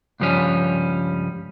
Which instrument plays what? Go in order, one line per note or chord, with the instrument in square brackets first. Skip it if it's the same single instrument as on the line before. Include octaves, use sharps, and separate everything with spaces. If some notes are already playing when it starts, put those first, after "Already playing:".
[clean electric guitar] C#2 G2 F3 G3 C#4